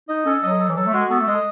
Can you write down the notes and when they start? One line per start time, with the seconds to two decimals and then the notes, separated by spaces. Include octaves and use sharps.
0.09 D#4 D#5
0.26 C#4 A4
0.43 F#3 D#5
0.60 A4
0.69 E3
0.76 F#3 A4
0.86 A3
0.93 G#3 F#4
1.10 B3 A4
1.21 A3
1.28 G#3 D#5